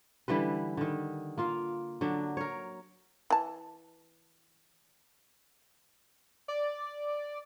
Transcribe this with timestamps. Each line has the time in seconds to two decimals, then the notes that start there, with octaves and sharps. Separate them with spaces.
0.28 D3 E3 G3 B4
0.77 D3 D#3
1.38 A#3 F4 F5
2.01 D3 F#3 D4
2.37 A#4 C#5
3.30 E3 A5
6.48 D5